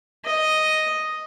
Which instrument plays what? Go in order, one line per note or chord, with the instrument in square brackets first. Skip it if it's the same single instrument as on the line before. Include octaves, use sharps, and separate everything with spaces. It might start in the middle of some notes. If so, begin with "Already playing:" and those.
[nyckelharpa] D#5